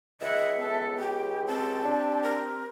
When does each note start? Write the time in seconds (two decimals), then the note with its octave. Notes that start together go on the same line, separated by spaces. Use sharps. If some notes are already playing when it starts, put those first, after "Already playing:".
0.22 C#2 D#5 E5 F#5
0.57 B3 A4
1.00 G4 G5
1.47 C4 G4 A5
1.85 D4
2.23 A#4